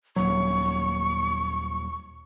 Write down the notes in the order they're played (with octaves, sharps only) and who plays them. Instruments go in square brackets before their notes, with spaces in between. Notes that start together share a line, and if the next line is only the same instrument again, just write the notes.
[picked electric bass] D#1 F#3 [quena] C#6